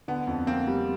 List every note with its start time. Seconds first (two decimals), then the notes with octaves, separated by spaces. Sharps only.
0.08 D3 B3
0.27 F2
0.47 A#3 C4
0.68 G3